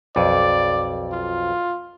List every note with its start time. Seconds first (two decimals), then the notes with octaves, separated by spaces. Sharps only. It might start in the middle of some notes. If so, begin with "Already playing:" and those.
0.16 B1 F2 D5
1.12 F4